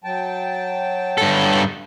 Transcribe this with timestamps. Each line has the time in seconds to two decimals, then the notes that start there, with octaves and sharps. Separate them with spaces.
0.04 F#3 G5 A5
1.18 G2 A4